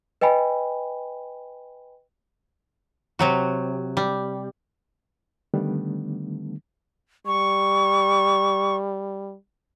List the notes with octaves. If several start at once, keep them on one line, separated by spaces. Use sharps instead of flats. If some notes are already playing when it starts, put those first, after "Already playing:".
B4 D#5 G5 G#5 B5
C3 F#3 F#4
G3
D3 D#3 G3 A3 B3 D4
G3 C#6